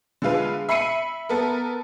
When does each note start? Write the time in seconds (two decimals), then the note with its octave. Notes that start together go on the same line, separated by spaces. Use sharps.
0.22 D3 G#3 F4 B4
0.69 E5 B5 C7 C#7 D#7
1.29 B3 A4 A#4